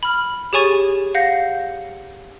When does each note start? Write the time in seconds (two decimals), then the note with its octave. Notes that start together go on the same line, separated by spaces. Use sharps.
0.03 B5 F6
0.53 G4 G#4 C#5 G#5 C#6 A6
1.15 F5 F#5 G6 A#6